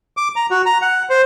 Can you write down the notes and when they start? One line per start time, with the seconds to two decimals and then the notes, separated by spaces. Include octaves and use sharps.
0.17 D6
0.36 A#5
0.51 F#4
0.66 A#5
0.82 F#5
1.10 C5